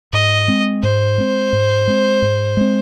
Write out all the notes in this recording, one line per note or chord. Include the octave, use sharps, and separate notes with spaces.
G#2 D#5
G#3 C4
G#2 C5
G#3 C4
G#2
G#3 C4
G#2
G#3 C4